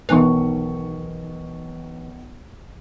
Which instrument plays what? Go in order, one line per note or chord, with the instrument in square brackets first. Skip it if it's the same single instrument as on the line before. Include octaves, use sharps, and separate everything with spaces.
[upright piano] B1 D#3 C#6 [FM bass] E3